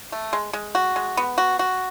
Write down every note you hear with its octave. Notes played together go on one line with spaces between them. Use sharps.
A3
G#3
G#3
F#4
G#3
B3
F#4
F#4